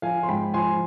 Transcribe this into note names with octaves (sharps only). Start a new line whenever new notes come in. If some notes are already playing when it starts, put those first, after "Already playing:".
F3 F5 G#5
C6
G#2 G5 B5
F3 G#5 C6